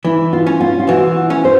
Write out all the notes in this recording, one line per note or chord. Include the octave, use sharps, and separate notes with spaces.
E3 E4
F4
C#4
F4
F4
E3 F#4
C#4
C5